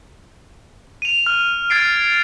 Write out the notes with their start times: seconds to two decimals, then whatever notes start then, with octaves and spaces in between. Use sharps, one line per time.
1.02 D#7 F7
1.26 F6
1.70 F6 G#6 A6 C7 D7